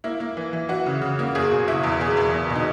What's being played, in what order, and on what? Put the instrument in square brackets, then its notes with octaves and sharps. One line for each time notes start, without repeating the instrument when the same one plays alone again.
[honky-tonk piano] A#3 E4
A#3
E3
E3
E3 F#4
C#3
C#3
A#3
F#1 G#4
B2
F#1 E4
E2
B2 G#4
E2
B2
B2
D#4